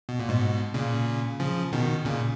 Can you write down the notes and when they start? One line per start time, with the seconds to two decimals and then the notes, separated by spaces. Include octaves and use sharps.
0.09 B2
0.20 A#2
0.29 G#2 B2
0.74 A#2 C#3
1.40 C#3 F3
1.73 B2 D#3
2.05 A#2 C#3